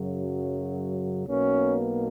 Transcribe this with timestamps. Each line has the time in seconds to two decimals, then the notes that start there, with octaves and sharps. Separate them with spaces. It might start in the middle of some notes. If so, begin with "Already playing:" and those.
Already playing: F#2 C#3 F#3
1.27 B1 B2 A#3 C#4